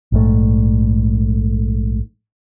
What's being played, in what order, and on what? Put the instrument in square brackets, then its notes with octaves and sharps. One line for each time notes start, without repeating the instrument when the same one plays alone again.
[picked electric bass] A#1 G#2 A3